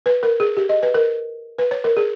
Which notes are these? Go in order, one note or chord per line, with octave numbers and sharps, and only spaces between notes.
B4
A#4
G#4
G4
D#5
B4
A#4
B4
C#5
A#4
G#4